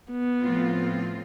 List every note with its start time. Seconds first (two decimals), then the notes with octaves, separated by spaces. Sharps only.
0.11 B3
0.40 A2 F3 C4 F4